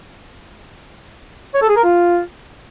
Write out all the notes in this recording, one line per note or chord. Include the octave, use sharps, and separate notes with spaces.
C#5
A4
G#4
A#4
F4